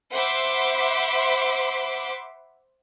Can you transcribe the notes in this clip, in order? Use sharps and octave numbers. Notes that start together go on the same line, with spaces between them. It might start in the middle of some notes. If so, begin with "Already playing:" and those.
C5 E5 F#5 B5 C6 D6